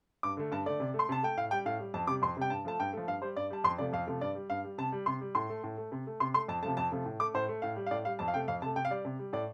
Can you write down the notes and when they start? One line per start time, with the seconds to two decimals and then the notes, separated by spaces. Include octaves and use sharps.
0.23 G2 D6
0.37 D3 A3
0.51 G2 A5
0.66 D3 A3 D5
0.80 C3
0.94 A3
0.99 C6
1.09 C3 A5
1.23 A3 G5
1.37 A2 F5
1.51 G3 G5
1.66 A2 F5
1.80 G3
1.94 F2 A5
2.07 C3 G3 D6
2.22 F2 C6
2.37 C3 G3 G5
2.50 G2 A5
2.65 F3 A3 A5
2.79 G2 G5
2.93 F3 A3
3.07 G2 F5
3.22 G3 C5
3.36 G2 D5
3.50 G3 A5
3.64 F2 C6
3.78 C3 F3 A3 D5
3.93 F2 F5
4.07 C3 F3 A3
4.21 G2 D5
4.35 G3
4.50 G2 F5
4.64 G3
4.78 C3 A5
4.92 G3
5.06 C3 C6
5.21 G3
5.35 A2 C6
5.49 A3
5.64 A2
5.77 A3
5.92 C3
6.07 A3
6.20 C3 C6
6.34 A3 C6
6.48 F2 A5
6.62 C3 F3 A3 A5
6.77 F2 A5
6.92 C3 F3 A3
7.06 A2
7.20 A3 D6
7.34 A2 C5
7.48 A3
7.62 A2 F5
7.76 G3
7.86 F5
7.91 A2 D5
8.05 G3 F5
8.19 F2 A5
8.28 F5
8.34 C3 A3 G5
8.48 F2 F5
8.62 C3 A5
8.66 A3
8.76 C3 G5
8.85 F5
8.90 G3 D5
9.05 C3
9.19 G3
9.33 A2 D5